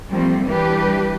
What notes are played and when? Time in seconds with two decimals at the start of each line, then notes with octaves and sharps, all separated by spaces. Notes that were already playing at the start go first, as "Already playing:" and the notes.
0.11 F3 G3 A3 A#3 C4
0.48 E3 G3 D4 G4 B4